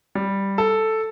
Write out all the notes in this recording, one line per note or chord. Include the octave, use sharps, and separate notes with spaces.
G3
A4